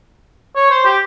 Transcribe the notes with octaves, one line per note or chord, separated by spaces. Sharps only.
C#5
C5
G4